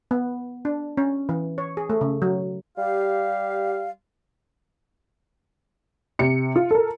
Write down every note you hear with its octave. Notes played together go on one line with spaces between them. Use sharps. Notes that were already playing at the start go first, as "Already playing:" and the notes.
B3
D4
C#4
E3
C#5
G#4
A3
C#3
F#3
G3 G4 F5
C3 C#7
F4
A4 A#4